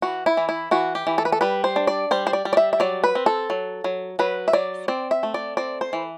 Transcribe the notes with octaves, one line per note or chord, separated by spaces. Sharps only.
E3 F#4
E4
E3
E4
E3 F#4
G4
E3
A4
B4
A4
G3 B4
C5
D4
D5
G3 C5
C5
D5
G3
D5
E5
E5
F#3 D5
B4
C4
A4
F#3
F#3
F#3 B4
E5
F#3 D5
C4 D5
E5
A3
D5
C4 D5
C5
E3